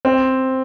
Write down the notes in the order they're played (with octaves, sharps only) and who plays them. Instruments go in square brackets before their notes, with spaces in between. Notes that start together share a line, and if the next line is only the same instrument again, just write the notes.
[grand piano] C4